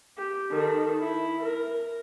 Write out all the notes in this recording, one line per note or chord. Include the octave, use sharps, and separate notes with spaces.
G4
D#3 A4
E4
A#4